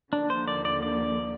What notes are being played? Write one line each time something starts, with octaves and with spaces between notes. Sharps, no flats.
D#2 D3 F3 A#3 D4
C5
D5
D5
D5